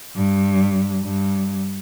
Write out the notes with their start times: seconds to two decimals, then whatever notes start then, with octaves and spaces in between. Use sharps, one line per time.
0.16 G2
1.03 G2